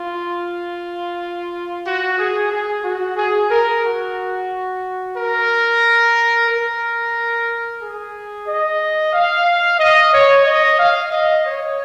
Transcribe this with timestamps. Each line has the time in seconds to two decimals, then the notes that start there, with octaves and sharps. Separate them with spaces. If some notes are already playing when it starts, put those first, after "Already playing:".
Already playing: F4
1.86 F#4
2.19 G#4
2.51 G#4
2.84 F#4
3.17 G#4
3.50 A#4
3.83 F#4
5.16 A#4
6.49 A#4
7.80 G#4
8.48 D#5
9.13 F5
9.79 D#5
10.13 C#5
10.46 D#5
10.79 F5
11.12 D#5
11.46 C#5